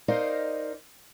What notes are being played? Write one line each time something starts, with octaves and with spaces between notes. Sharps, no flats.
D#4 A#4 C5 D5 D#5 F5